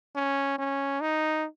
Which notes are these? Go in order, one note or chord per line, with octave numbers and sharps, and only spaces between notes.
C#4
C#4
D#4